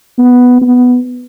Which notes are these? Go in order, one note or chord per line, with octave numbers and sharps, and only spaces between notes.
B3
B3